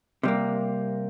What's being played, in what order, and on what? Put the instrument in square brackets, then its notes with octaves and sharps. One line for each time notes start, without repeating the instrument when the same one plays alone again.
[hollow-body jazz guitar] C3 G3 A#3